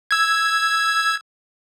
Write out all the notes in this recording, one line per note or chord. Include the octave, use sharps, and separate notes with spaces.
E6 G#6